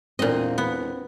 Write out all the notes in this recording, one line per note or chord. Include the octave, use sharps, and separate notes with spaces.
E1 A#2 C4 D#5
E1 B3